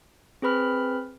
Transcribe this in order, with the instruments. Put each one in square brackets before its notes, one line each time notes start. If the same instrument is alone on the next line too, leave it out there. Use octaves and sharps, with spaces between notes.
[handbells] C4 G#4 B4 B5 F6